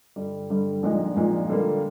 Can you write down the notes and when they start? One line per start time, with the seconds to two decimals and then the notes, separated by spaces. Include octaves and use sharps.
0.16 G2 D3 G3
0.50 G2 D3 G3
0.83 A#1 A#2 G#3 D#4
1.16 A#1 A#2 G#3 D#4
1.50 D3 G3 A#3